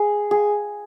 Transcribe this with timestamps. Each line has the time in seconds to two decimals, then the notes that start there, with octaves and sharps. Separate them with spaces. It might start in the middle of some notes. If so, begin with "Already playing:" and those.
Already playing: G#4
0.31 G#4